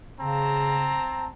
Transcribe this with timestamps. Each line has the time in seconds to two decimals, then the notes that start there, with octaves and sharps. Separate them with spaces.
0.19 C#3 C4 A5 A#5